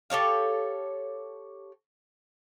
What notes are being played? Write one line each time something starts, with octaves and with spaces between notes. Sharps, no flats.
G4 A4 C#5 F5